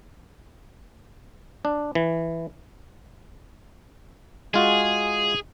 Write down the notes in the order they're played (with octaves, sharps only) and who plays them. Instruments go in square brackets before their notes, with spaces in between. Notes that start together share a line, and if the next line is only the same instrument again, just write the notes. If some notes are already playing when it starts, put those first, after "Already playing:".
[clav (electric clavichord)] D4
E3
[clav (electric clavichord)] G#3 F4 F#4 [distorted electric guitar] G#4